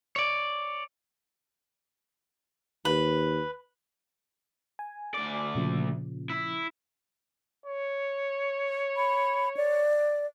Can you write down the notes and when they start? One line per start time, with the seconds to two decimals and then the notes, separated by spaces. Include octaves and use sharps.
0.16 C#5 D5
2.85 D#2 B4
4.79 G#5
5.15 D2 D5
5.55 A#2 C#3 F3
6.30 E4
7.66 C#5
8.97 B5
9.57 D5